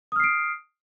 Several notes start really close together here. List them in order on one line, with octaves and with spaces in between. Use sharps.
D#6 F6 C7 D7